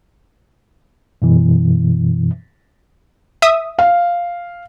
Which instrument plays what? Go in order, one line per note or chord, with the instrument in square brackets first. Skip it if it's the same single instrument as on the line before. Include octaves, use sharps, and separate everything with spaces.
[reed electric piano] F#2 B2 E3
[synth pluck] E5 D#6
[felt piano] F5